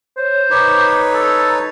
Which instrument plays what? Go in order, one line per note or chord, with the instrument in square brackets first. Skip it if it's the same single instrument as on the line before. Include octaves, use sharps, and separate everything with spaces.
[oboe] C5 [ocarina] C#5
[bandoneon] D#4 B4 C#5 [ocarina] D6
[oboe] A4 [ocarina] A#5